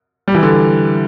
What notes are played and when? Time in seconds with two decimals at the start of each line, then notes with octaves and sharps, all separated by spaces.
0.28 G3
0.34 E3
0.43 D3